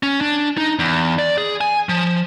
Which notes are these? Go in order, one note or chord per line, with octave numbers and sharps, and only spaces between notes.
C#4
D4
D#4
E2
D5
G#4
G#5
F3